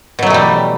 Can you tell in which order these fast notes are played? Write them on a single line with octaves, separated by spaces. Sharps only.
B2 F#3 A3 E3 G3